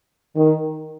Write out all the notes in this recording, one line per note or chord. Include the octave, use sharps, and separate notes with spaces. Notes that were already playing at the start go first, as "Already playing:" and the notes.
D#3